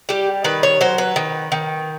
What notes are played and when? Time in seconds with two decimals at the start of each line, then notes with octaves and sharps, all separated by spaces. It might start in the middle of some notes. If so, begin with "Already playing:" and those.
0.09 G3 G4
0.44 D#3 B4
0.63 C#5
0.81 F#3 C5
0.98 B4
1.16 D#3
1.52 D#3